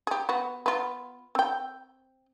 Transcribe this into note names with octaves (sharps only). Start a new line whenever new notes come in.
G4 G#4
B3 F#4
B3 F4
C4 G5